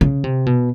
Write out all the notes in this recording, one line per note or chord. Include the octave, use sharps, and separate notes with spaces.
C#3
C3
B2